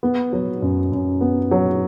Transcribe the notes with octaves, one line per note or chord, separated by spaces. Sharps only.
B3
F#3
F#2
F#2
B3
F#3